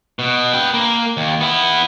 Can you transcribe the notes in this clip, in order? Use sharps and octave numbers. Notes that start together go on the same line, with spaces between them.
B2
B4 G5
A#3
D#2
B3 E4